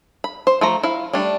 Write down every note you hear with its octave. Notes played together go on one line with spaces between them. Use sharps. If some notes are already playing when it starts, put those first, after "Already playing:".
B5
C5
F3 A3 A#5
E4 F5
G3 A3 D4